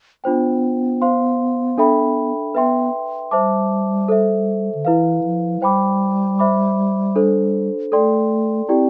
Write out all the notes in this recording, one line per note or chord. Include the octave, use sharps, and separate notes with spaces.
B3 D4 F4 C5 G5
C5 F5 C6
D4 A4 E5 G5 B5
B3 B4 E5 G5 C6
G3 C5 E5 A5 D6
A4 C5 E5
D3
E3 E4 B4 F5
F3
G3 C5 G5 B5 D6
C5 E5 B5 D6
D4 A4 C5
A3 A4 D5 G5 C6
C4 E4 G4 D5 G5